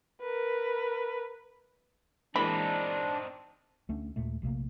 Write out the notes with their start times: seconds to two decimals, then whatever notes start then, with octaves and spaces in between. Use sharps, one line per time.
0.21 A#4 B4
2.36 E3 G#3 A#3 C4 D4 D#4 B5
3.89 D2 A3 C#4 D4
4.16 D#2 A#2 G#3 A3
4.42 A#1 C3 A3 A#3